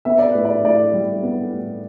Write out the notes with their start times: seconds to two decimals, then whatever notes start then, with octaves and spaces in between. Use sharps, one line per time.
0.05 B3 E5
0.19 D5
0.31 A2 B4
0.45 D5
0.64 A2 D5
0.93 G3
1.23 B3
1.53 A2